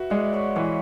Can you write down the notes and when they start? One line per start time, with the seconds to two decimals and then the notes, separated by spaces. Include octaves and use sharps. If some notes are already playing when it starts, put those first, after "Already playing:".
Already playing: F#4 B4 E5
0.10 G#3 D5 F#5
0.33 C#5 E5
0.56 E3 F#5
0.65 E5